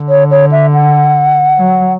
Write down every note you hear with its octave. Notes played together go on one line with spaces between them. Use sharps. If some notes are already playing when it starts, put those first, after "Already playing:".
Already playing: D3
C#5
C#5
E5
F#5
F#3